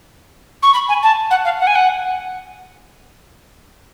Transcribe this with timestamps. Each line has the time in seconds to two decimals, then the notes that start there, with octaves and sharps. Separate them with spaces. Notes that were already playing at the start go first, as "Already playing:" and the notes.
0.63 C#6
0.74 B5
0.88 G#5
1.03 A5
1.31 F#5
1.45 F5
1.59 F#5
1.67 G#5
1.75 F#5